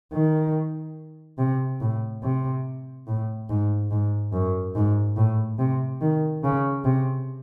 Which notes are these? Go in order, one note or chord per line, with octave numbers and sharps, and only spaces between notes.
D#3
C3
A2
C3
A2
G#2
G#2
F#2
G#2
A2
C3
D#3
C#3
C3